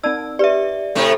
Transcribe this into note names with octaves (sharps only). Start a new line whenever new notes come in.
C4 D#4 D5 A5 E6
G4 B4 D5 E5
A2 C3 A3